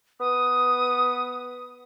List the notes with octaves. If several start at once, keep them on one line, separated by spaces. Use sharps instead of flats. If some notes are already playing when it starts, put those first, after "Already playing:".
B3 D#6